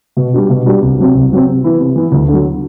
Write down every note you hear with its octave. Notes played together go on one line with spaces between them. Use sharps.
B2
G3 D4 F#4
B2
G3 D4 F#4
C2
C3 F#3 C4
C2
C3 F#3 C4
C3
E3 B3 E4
C3
E3 B3 E4
D2
D3
F#3